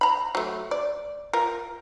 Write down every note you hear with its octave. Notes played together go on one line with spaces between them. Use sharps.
A#5 B5
F#3 A3
D5
F4 A#4